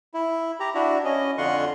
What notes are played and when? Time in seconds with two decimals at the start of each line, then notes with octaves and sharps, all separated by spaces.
0.14 E4
0.60 G4 A#5
0.75 D4 E4 F#4
1.04 C#4 D#5
1.38 F2 D3 F4 F#5 C6 C#6